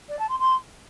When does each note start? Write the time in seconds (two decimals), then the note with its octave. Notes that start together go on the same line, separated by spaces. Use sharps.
0.09 D5
0.19 A5
0.29 C6
0.39 C6